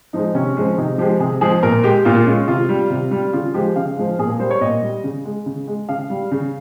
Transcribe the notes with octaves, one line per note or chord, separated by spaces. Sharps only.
F3 G#3 D#4
C3 C#4
F3 G#3
C3 D#4
F3 G#3 G4
C3 G#4
F3 G#3 G#4
A#2 A#4
G#3 G4
A#2 F4
G#3 C#4
C3 F4
G3
C3
G3
C#3 F4
F3 G#3 G4
C#3 F5
F3 G#3
A#2 G#4
A#4
G3 C5
C#5
A#2 D#5
G3
C#3
G#3
C#3
G#3
C#3 F5
G3
C#3